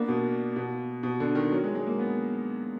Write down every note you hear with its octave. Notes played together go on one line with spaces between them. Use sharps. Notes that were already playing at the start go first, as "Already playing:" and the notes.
Already playing: A#3 B3 D4
B2
B2
B2
D3
D#3
F#3
G#3
G#3
A#3
B3